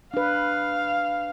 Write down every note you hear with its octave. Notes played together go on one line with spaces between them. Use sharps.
D4 B4 F5